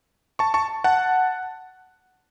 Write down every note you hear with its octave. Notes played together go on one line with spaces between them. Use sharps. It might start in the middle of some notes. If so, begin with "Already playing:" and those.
A5 C#6
A5 C#6
F#5 A5